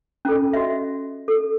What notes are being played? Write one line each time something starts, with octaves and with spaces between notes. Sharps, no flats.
C#4 F4 A4
F#4 D#5 E5
A4